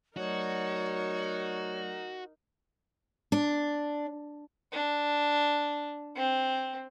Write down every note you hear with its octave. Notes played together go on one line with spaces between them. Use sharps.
F#3 A3 D#4 F#4 A#4 C#5 D5
D4
D4
C4